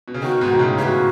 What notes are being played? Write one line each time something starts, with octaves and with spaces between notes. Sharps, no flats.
B2
C#3
B2 D#3 F#4
G#2 B2
D#3
A2 C#3
C#3 E3 F#4 G#4